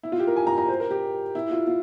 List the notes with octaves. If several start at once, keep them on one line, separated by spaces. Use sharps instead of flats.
E4
F4
G4
A#4
G#5
A#5
A#5
C5
A#4
G4
E4
F4
F4